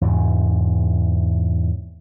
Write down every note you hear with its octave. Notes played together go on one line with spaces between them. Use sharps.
E2 G#2 C3